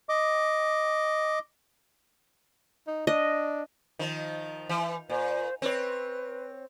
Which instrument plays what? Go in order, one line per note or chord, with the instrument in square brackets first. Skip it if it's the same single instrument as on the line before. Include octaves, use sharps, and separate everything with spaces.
[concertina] D#5 D6
[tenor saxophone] D#4
[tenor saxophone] D4 [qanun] D#5
[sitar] D#3 F3
E3
[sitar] A#2 [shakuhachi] C5
[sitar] C4 C#5 [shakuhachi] B4